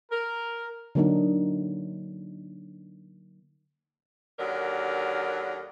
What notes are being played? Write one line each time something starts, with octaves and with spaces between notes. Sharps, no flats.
A#4
D3 F#3 A#3 D4 D#4
D#2 D3 F#3 A#4